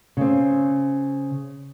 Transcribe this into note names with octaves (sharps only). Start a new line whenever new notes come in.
C#3 C4